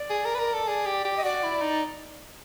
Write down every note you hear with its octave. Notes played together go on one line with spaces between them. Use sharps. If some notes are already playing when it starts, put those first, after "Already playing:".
Already playing: D5
G#4
A#4
B4
A#4
A4
G#4 D5
G4
G4
D#5
F#4 D5
E4
D#4